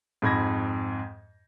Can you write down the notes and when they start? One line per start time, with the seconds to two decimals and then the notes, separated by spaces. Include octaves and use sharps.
0.22 F2 G#2 B5 G#6 A#6